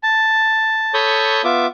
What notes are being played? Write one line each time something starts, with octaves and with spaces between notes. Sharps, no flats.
A5
A4 C#5 B5 C#6 D#6 G6
B3 F4 E5 D6